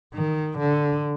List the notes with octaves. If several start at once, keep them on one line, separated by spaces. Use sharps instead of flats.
D#3
D3